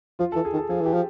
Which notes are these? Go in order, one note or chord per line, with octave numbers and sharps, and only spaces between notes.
F3 F4
E3 A4
G#4
D#3
A4
F3 G#4
E3 G4
F3